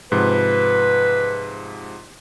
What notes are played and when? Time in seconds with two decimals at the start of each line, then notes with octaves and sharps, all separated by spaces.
0.12 G#2 C3 F3 B4